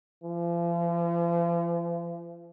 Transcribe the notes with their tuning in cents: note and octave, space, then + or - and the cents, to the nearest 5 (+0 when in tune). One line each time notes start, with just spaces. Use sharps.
F3 -40